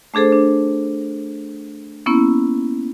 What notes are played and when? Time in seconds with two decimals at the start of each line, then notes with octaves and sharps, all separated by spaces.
0.14 A3 D4 G#4 A4 C5
0.32 D4
2.06 A#3 B3 C#4 E4